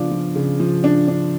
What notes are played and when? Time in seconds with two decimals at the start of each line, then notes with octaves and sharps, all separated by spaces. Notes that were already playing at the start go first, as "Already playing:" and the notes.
Already playing: C#3 F3 B3 D4 D5 F5 D6
0.12 F3
0.35 C#3
0.60 F3
0.84 D4
1.08 D4